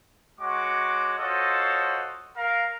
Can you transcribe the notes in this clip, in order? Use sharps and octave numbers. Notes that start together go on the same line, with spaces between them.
G#3 F#4 C#5 C#6 D6
F4 F#4 A4 C5 C#5 D#5
A#4 F5